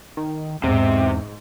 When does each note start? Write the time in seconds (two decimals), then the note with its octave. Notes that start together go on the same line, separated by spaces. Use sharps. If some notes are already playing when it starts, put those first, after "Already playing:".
0.17 D#3
0.64 E2 G#2 C3